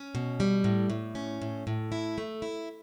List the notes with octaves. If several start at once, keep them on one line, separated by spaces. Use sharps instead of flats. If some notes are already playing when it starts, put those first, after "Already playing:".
Already playing: C#4
B2
G3
A2
A2
C#4
A2
A2
E4
A3
E4